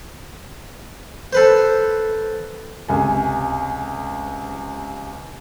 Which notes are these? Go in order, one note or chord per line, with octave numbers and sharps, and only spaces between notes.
A4 B4 C5
C#2 C3 G#5